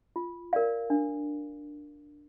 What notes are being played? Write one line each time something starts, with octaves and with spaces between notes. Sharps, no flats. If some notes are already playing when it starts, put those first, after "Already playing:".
F4
A#4 D5 F5
D4